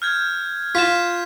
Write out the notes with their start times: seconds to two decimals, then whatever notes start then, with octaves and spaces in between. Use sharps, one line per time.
0.02 F6 G6 G#6
0.75 F4 B6 E7